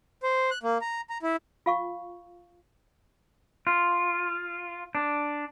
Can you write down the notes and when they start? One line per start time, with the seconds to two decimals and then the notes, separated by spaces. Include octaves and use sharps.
0.23 C5
0.51 F#6
0.63 A#3
0.81 A#5
1.10 A#5
1.23 E4
1.66 F4 F5 C#6
3.67 F4
4.95 D4